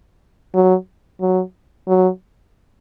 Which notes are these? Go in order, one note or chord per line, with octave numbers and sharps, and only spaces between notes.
F#3
F#3
F#3